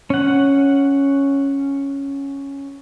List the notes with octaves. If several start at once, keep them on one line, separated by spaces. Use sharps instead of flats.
C#4 F#5